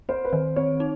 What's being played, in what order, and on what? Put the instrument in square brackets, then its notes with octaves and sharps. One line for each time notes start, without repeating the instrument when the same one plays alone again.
[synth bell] C4 [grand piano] C5
[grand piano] B4
[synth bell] D#3 [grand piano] C5
[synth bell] C4 [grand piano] C#5
[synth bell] D#4